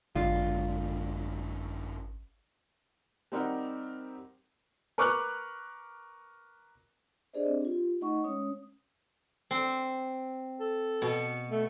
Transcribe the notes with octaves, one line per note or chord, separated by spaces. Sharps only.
G#1 F#2 D3 G#3 F4
G3 C4 D#4 G4 A#4 F#5
A#4 B4 C#6 D6 F6 F#6
D4 G4 G#4 C5 D5 D#5
C4 D4
F4 G4
A3 D#4 D#5 F#5 C#6
G#3 C#4 C#5 D#6
C4
A4
B2 B3
A3